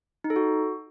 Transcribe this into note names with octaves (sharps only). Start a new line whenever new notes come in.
D#4
A4
F#4